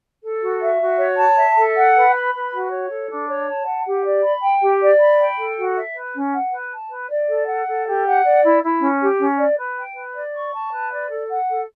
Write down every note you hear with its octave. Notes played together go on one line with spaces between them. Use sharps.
A4
F#4
E5
F#4
C#5
A5
E5
A4
F#5
B4
B5
B4
F#4
C#5
A4
D4
C#5
A5
F#5
G4
D5
B5
G5
G4
D5
B5
G5
A4
F#4
E5
B4
C#4
F#5
B4
A5
B4
D5
A4
F#5
A4
G4
F#5
D5
E4
E4
C#4
G4
C#4
D5
B4
G5
B4
D5
C#6
A5
B4
D5
A4
F#5
A4